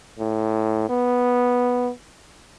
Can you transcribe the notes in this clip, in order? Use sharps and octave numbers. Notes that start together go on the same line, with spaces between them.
A2
B3